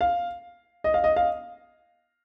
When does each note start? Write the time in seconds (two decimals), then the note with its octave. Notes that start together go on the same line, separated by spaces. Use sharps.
0.01 F5
0.84 D#5
0.94 F5
1.04 D#5
1.16 F5